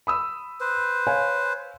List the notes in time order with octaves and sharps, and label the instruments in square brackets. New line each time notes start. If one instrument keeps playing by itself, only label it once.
[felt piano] B5 D#6 E6
[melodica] B4 C5
[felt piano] C#5 F5 G#5